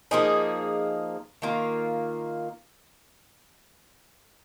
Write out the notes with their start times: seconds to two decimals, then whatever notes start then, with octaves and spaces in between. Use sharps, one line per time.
0.11 F3 A#3 D#4 G#4
1.42 D#3 A#3 F4 A#4